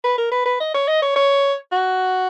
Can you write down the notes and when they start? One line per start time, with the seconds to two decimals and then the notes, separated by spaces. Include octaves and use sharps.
0.04 B4
0.18 A#4
0.32 B4
0.46 B4
0.60 D#5
0.74 C#5
0.87 D#5
1.02 C#5
1.16 C#5
1.72 F#4